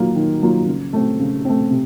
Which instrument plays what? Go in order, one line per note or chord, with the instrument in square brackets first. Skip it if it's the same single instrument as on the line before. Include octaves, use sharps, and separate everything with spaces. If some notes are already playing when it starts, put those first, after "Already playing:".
Already playing: [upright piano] D#3 F#3 A#3 F4
D#3
F#3 A#3 F4
C#3
A3 C4
C#3
A3 C4
C3